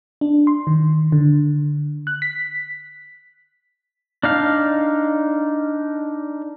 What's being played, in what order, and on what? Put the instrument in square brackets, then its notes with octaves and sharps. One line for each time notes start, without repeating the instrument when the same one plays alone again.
[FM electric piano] D4
C6
D#3
D3
F#6
B6
[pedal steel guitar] D4 D#4 F5